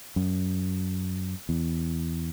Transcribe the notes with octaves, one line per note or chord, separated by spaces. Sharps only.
F#2
E2